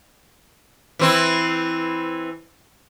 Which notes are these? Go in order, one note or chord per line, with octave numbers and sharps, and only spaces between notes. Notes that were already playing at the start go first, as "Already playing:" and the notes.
E3 C4 E4